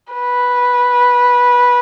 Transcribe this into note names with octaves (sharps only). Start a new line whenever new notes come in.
B4